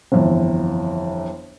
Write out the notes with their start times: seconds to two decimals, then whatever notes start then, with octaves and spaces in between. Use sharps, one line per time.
0.12 G1 F2 E3